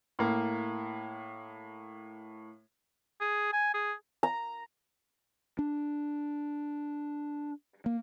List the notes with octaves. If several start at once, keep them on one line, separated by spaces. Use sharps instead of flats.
A2 A#3
G#4
G#5
G#4
A#5
D4
A#3